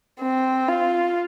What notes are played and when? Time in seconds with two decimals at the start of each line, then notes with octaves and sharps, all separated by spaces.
0.21 C4
0.68 F4